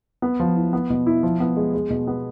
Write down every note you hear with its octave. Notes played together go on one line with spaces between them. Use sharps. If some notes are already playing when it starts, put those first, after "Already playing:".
B3
F3
E4
B3
B2
E4
F3
B3
G#3
G#3
B2
B3